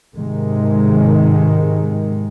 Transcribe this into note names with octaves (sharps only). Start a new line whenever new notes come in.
G#2 C3 D#3 G#3